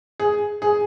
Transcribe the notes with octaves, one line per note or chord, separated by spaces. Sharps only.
G#4
G#4